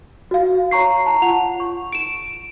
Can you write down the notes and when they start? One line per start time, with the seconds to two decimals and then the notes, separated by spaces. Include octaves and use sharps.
0.31 F#4 F5
0.71 C#5 A#5 C#6 C7
1.06 A5 A#5
1.22 F4 F#5 F7
1.60 C#6
1.93 D7 E7